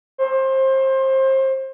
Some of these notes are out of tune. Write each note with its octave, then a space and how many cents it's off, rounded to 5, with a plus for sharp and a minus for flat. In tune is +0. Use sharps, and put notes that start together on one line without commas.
C5 +25